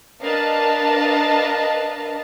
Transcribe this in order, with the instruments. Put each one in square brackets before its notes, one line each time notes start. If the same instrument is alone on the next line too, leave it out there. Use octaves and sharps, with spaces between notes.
[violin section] D4 A#4 B4 D#5 F5 A5